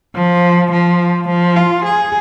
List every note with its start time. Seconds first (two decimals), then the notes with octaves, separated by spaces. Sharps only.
0.15 F3
0.72 F3
1.28 F3
1.56 F4
1.85 G#4